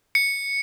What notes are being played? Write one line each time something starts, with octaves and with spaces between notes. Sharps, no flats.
C#7